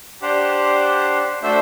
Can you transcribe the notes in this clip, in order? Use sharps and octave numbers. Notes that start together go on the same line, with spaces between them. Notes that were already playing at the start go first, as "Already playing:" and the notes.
D4 G4 C5 F#5
A3 D4 F#4 C5 E5